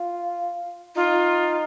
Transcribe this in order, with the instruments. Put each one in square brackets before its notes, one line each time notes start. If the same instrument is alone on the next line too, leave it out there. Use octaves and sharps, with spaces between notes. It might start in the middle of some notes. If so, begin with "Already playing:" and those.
Already playing: [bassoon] F4
[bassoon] D#4 [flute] F4